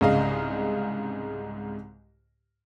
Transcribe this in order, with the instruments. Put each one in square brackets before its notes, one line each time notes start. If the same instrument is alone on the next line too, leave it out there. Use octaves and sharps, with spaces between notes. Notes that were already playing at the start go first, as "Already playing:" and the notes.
[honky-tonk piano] C2 G#2 C#3 D#5 F5